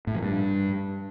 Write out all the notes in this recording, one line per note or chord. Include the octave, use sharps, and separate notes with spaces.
A2
F3
G2